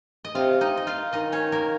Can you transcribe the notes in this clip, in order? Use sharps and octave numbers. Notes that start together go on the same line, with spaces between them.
D#5
C3 F4 F5
D#4 D#5
D#5
F4 F5
D#3 D#4 D#5
C#4 C#5
A#3 A#4